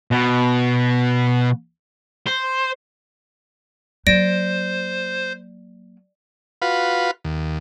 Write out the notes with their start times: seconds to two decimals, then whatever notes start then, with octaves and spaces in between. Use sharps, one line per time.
0.11 B2
2.27 C5
4.07 F#3 A#3 C5 D5 A#6 D7
6.62 F4 F#4 B4 F5 B5
7.25 D#2